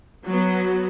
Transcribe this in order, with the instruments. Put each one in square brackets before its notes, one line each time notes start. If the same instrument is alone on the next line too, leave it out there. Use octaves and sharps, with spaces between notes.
[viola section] F#3 B3